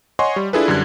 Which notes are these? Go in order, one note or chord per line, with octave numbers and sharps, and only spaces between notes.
C#5 D#5 F#5 G#5 C6 C#6
G3
D4 E4 F4 G#4 A4 B4
F#2 D3 G3 F#6 G#6